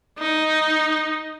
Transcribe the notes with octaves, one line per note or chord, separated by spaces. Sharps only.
D#4